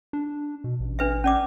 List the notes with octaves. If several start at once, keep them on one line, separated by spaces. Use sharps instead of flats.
D4
B2
A1
D4 B4 E5
C#4 D5 D6